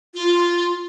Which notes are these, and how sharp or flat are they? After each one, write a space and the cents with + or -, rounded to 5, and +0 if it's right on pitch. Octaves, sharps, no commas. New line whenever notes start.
F4 -5